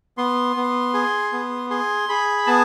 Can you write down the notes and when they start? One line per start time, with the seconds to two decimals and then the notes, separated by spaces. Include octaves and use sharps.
0.18 B3 C6
0.56 B3
0.94 G#4
1.32 B3
1.70 G#4 C6
2.09 G#4 B5
2.47 B3 A5